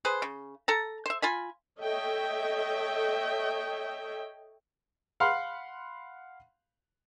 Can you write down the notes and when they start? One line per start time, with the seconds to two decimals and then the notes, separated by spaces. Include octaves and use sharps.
0.05 G#4 B4 C5
0.22 C#3
0.68 A4 A5 A#5
1.06 C5 E5
1.22 F4 G#5 B5
1.80 A4 C#5 D#5 E5 G5
5.20 F5 F#5 B5 C6 F6